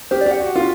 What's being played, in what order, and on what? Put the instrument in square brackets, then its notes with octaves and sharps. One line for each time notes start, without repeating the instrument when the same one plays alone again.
[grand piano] G4 [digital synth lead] C5
[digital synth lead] D5
[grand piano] G4 [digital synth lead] F#5
[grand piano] F#4
F4